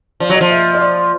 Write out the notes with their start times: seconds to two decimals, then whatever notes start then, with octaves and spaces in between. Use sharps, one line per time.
0.20 F3 D5
0.30 F#3
0.35 D#5
0.41 F3
0.51 E5
0.74 D#5
0.81 D5